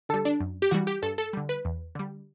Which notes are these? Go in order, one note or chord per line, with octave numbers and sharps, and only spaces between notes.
D3 G3 A4
D4
F#2
G4
E3 G3 F#4
G4
G2 A4
A4
D3 G3
B4
E2
D3 G3